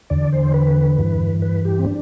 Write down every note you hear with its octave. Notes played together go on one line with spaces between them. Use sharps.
E2 D3 D5
C5
B4
G2 E3
B4
G4
C4
D4